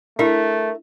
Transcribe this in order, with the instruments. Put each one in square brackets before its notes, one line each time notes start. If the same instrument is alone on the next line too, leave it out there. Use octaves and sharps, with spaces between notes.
[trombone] A3 [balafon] D4 E4 [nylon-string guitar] A#4 E5